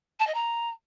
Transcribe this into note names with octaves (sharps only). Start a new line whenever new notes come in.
A5
D#5
A#5